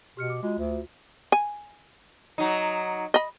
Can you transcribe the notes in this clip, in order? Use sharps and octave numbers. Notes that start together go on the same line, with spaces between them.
B2 G4 F6 C#7
D6
G#3 F4 F#4
D2
G#5
F#3 D#4
D#5 B5